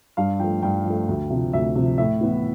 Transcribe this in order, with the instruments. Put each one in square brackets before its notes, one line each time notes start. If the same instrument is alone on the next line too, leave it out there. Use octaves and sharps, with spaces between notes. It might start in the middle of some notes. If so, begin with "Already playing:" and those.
[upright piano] G2 F5
F3 A3 G5
G2 G5
F3
A3
D2
C3 F3
D2 E5
C3 F3
A2 E5
E3 B3 E4